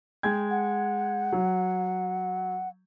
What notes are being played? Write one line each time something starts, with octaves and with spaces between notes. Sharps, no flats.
G#3 G5 G#6
F#5
F#3